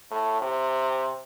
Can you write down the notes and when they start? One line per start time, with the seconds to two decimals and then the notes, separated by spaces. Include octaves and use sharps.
0.11 A2
0.41 C3